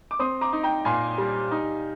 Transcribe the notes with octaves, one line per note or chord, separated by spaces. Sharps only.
D6
C4 C6 D#6
A#5 D6
D#4
G5 A#5
A#2 G#5 C6
G3
D#4